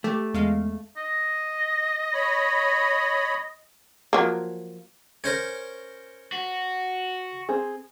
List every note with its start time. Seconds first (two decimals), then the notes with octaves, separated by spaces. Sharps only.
0.04 A3 G4
0.34 E2 G#3 F5
0.97 D#5
2.14 C#5 B5
4.13 F3 F#3 A#3
5.24 C#4 A#4 C5 C#5
6.32 F#4
7.49 C4 G#4